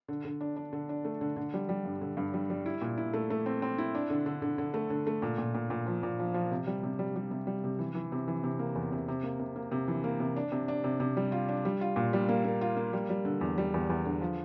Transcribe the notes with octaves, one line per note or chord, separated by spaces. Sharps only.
D3
D3
D4
D4
D3
D4
A3
D3
D3
G3
G3
G2
D3
G2
G3
G3
E4
A#2
E4
A3
A3
C4
C4
E4
D4
D3
D3
D3
D3
A3
D3
A3
A#2
A#2
A#2
A#2
F3
A#2
F3
F3
C3
G3
C3
G3
G3
C3
G3
C3
E3
E3
C3
E3
C3
A#3
E2
C3
C3
A#3
C3
A#3
C3
E3
A#3
C3
D4
C3
D4
C3
C3
G3
F4
D4
G3
F4
A#2
G3
A#3
A#3
F4
A#3
G3
G3
D3
E2
G3
E2
E2
D3
F3